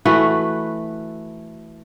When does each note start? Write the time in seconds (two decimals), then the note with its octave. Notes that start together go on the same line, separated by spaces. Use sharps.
0.05 E3 A3 F#4 B4